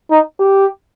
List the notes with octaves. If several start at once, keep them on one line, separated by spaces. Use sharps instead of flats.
D#4
G4